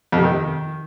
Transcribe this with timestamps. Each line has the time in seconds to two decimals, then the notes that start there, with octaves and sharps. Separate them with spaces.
0.12 F2
0.18 C3
0.23 D#3